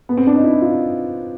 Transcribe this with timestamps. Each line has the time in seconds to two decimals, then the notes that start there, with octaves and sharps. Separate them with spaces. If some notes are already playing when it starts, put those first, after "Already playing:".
0.09 B3
0.17 C4
0.27 D4
0.35 D#4
0.44 E4
0.61 F4